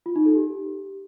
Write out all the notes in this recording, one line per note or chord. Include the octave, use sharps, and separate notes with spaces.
F4
D#4
A4
G4